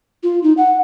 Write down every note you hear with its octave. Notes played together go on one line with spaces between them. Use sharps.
F4
D#4
F#5